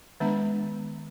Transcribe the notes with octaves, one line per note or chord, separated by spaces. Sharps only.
D#3 G#3 B3 D4